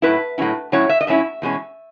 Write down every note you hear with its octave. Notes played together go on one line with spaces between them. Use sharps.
A2 F#3 C#4 E4 B4
A2 F#3 C#4 E4
A2 F#3 C#4 E4 C#5
E5
D#5
A2 F#3 C#4 E4 E5
E2 B2 G#3 C#4